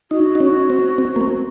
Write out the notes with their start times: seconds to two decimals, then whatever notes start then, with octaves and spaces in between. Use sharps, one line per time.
0.11 D#4 F#4
0.35 D#4
0.40 C#4
0.70 C4
0.98 C4
1.16 A#3
1.21 C4